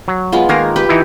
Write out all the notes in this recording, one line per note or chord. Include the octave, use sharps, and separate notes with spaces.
F#3
G#3 B3 F4
D#3 G#3 A#3 G#4 A#4
G4 B4
E3 D#4 E4